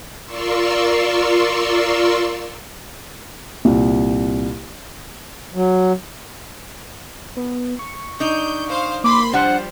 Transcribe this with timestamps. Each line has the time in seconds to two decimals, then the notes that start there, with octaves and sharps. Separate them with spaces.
0.24 F4 A#4 D5 C6 C#6 E6
3.65 C2 A#2
5.54 F#3
7.37 B3
7.79 C#6
8.20 D4 D#4 G6
8.69 C5 F5
9.04 A#3 B5 C6 D6
9.33 F3 G3 D4 C5 F#5